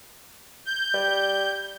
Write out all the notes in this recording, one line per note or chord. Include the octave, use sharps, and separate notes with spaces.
G6
G3